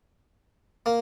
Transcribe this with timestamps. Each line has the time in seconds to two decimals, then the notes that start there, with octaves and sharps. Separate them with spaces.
0.86 A#3